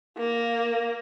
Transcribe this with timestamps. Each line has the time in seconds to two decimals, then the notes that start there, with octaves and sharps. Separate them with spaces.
0.17 A#3